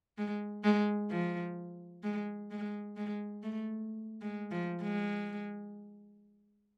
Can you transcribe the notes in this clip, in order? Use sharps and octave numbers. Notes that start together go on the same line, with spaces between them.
G#3
G#3
F3
G#3
G#3
G#3
A3
G#3
F3
G#3